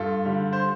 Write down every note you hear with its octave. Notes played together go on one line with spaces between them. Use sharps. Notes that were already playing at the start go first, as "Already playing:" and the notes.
Already playing: G2 F4 A4
D3 G3
C5